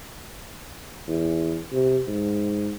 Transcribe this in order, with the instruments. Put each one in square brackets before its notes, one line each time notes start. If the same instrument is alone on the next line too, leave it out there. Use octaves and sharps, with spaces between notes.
[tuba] E2
C3
G#2